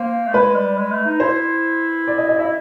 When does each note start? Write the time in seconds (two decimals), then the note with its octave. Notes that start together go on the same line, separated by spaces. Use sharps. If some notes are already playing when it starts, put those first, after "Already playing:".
Already playing: A#3 C5
0.27 A3
0.34 G#3 B4
0.55 G3
0.78 G#3
0.92 A3
1.06 D#4
1.20 E4 C5
2.08 D5
2.18 D#5
2.29 D#5
2.38 E4 E5